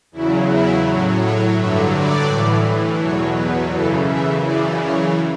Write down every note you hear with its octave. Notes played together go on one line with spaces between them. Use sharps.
E2 C#3 F#3 E4
E4
A2 F#3
C#5
G2 D3 F#3 E5
D5
A2 E3
E2 B2 F#3 C#5
B4
F#2 C#3 E3 A4
E5
F#2 C#3 E3 D5
C#5